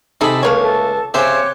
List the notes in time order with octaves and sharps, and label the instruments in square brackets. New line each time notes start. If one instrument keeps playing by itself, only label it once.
[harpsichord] C3 B5 [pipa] D#4 G#4 A4
[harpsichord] C#2 [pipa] A3 A#3 C#5
[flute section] A4
[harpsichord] C#3 C5 E5 [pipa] C4 G4 [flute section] C#5 D6 F#6